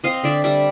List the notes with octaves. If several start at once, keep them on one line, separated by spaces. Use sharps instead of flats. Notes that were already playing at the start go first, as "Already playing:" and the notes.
C4 D#5 F5
D3 D5 E5
G3 D5 E5